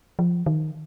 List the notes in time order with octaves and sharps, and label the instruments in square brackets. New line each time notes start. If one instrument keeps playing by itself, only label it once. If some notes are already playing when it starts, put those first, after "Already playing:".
[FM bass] F3
D#3